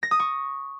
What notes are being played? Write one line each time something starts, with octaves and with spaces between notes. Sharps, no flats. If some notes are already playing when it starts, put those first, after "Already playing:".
A#6
D#6
C#6